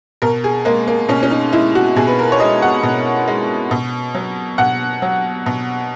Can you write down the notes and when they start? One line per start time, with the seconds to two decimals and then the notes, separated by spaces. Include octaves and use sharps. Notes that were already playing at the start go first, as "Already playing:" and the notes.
0.22 B2 A#4
0.44 G#4
0.65 G#3 A#3
0.88 A#3
1.09 B2 C#4
1.23 C#4
1.31 D#4
1.53 G#3 E4
1.75 F#4
1.96 B2 G#4
2.07 B4
2.19 A#4
2.32 C#5
2.40 G#3 D#5
2.62 F#5
2.83 B2
3.28 G#3
3.71 B2
4.15 F#3
4.58 B2 F#5
5.02 F#3
5.46 B2